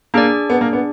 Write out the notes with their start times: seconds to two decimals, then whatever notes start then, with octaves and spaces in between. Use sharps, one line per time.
0.14 A#3 D4 G#4 D5
0.50 B3
0.61 A#3
0.73 B3